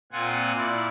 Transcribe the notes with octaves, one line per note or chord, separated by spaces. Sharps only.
A#2 C4 F4 F#5 G#5
A#2 E4 D5